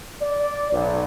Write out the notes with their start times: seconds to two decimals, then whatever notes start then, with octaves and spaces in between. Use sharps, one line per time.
0.21 D5
0.71 B1